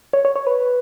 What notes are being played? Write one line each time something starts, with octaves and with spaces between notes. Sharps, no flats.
C#5
C#5
C#5
B4